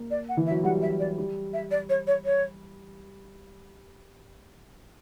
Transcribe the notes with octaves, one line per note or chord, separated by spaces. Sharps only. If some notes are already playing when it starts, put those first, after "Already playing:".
Already playing: A#3
D5
F#5
E3
E5
F#3
G3 F#5
E5
D5
G3
E5
D5
C#5
C#5
C#5